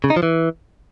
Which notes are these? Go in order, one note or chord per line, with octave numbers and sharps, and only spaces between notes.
C#3
D#4
F3
E3